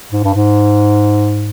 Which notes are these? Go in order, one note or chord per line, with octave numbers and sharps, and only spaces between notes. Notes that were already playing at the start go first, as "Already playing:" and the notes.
G#2
G2
G#2